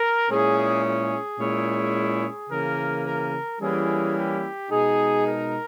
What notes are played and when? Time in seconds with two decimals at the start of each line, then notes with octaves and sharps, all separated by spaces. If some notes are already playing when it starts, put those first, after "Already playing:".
Already playing: A#4
0.30 A#2 G#3 C#4 E4 G#4
0.84 G#4
1.39 A#2 G#3 C#4 E4
2.50 C#3 E3 A#3 A#4
3.05 A#4
3.60 E3 G3 A#3 C#4 E4 G#4
4.15 G4
4.70 B2 G#3 D#4 G#4
5.25 A#4